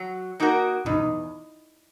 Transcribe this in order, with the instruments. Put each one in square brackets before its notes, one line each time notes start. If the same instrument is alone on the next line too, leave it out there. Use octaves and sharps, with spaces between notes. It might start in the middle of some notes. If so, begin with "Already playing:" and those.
Already playing: [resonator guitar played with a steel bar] F#3
A#3 D#4 F#4 A#4
[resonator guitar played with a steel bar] E2 [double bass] D#4